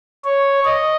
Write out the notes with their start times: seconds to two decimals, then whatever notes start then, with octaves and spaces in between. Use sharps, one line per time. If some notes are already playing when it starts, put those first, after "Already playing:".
0.25 C#5
0.65 D#5